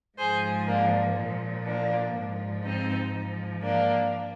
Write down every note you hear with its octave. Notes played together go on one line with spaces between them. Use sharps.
G#2 F3 G#4 C5
A#3 D4
A#2 F3
A#3 D4
G#2 F3
C4 D#4
G#2 F3
A#3 D4